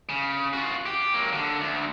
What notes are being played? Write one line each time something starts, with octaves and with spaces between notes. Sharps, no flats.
C#3
F4 F#4
G4
F#3 A#3
D3
D2